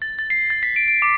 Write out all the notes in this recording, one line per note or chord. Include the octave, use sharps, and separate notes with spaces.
A6
A6
C7
A6
B6
D7
D7
D6